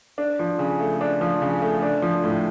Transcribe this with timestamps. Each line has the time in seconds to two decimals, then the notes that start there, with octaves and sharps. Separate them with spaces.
0.18 D4
0.39 F3
0.59 C#3
0.80 A3
1.01 D4
1.21 F3
1.42 C#3
1.62 A3
1.82 D4
2.02 F3
2.24 A2